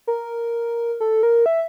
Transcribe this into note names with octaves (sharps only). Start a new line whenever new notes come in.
A#4
A4
A#4
E5